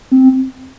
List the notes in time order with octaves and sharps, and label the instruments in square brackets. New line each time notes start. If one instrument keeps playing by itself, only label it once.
[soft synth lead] C4